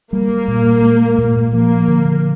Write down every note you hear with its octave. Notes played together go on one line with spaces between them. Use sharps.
G3 A#3
A#2
G#3
A#2
F3 A#3
D3